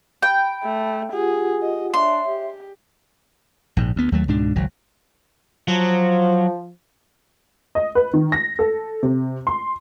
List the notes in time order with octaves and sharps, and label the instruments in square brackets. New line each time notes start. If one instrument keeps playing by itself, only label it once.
[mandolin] G5 [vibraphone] B5
[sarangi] A3
[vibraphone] F4 G4 F#5 [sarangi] G#4
[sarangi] D#5
[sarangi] D4 [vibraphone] C#5 E5 [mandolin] C6
[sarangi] G4
[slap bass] A#1 G#2
D2 B3
D#2 F#3 A3
C#2 G#2 B2 D4
G#1 C#2 F#3
[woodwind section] F3 [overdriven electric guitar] F#3
[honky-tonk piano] D#5
B4
D#3
A#6
A4
C3
C6